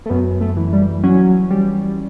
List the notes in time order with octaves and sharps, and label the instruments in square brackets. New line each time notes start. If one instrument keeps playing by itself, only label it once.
[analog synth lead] A3
[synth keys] F#2 [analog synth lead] B3
[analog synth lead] A3
[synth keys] E3
[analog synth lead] G3
[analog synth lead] F#3 [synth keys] C#4
[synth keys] G3